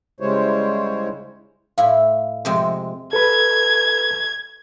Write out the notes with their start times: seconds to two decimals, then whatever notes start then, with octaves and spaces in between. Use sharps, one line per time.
0.20 C#3 G3 G#3 E4 C5 C#5
1.78 A2 E4 F5
2.45 F2 C3 G#3
3.13 A4 B4 B5 G#6